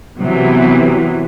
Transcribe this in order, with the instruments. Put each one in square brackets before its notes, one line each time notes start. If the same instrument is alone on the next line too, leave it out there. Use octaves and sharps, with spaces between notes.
[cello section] C3 E3 F#3 B3